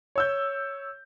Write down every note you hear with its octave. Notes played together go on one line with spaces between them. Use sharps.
C#5 E6 G6